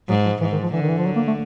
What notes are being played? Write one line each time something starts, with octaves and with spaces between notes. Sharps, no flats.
G#2 F#3
F3
G#2 E3
D#3
F3
D3 E3
D#3
E3
F3
F#3
A#3
A3